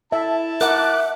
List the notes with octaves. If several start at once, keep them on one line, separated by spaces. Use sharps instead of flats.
E4 E5 A5
A#4 E5 F#5 D6 F#6